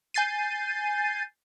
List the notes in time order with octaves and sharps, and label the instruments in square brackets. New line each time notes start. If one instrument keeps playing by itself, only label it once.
[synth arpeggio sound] G#5 G6 A6 C7 D#7